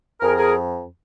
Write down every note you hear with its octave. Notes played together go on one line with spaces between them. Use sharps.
F2 G#4 A#4
G#4 A#4